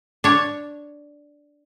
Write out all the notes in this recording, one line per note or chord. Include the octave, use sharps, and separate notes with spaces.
D4 C#5